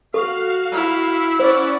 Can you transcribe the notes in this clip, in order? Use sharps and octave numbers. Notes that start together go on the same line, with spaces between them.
F#4 A4 F5 C#6
E4
C#4 C5 D5 F#5